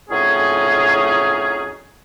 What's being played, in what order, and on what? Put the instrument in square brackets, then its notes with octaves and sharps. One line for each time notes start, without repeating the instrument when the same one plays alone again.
[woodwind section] F2 A2 F#3 C#4 D#4 G#4